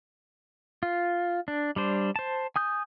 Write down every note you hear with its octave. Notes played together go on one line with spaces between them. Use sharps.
F4
D4
G3 D4 C5
C5 A5
G#5 D#6 G6